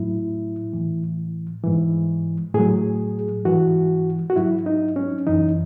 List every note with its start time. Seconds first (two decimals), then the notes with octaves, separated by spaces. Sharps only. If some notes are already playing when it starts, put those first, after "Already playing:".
Already playing: A2 F#3 E4
0.73 A2 E3
1.64 G#2 E3
2.54 A2 F#3 G#4
3.45 G#2 E3 F#4
4.30 F#4
4.36 G#2 F#3 E4
4.66 D#4
4.96 C#4
5.27 F#2 E3 D#4